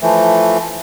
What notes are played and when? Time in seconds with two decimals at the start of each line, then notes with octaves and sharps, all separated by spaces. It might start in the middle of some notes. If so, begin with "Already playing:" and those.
0.01 E3 F3 A3